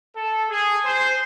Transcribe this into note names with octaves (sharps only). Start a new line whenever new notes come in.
A4
G#4
C5